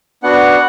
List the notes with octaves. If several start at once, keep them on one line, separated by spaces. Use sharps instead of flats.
B3 D4 F#4 F#5